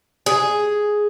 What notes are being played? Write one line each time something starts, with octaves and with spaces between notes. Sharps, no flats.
G#4